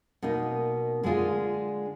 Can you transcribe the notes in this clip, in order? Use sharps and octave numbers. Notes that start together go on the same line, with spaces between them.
B2 A#3 D#4
D3 G#3 D4 F4 G#4